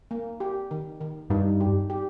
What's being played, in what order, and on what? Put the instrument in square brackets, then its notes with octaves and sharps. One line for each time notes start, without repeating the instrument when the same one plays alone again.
[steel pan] A#3
G4
D#3
D#3
[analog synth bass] G2 [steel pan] D#4
[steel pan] G4
G4